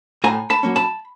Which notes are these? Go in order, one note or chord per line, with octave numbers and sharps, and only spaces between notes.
A2 G#5 A#5
A5 B5
F#3 A#3 C#4
A5 B5